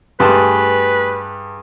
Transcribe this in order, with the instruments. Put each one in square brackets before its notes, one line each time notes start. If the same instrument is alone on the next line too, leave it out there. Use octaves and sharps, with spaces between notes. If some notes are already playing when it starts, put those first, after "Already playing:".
[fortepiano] G2 A5 C6 [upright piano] A3 G4 [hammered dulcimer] G#4 [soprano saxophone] B4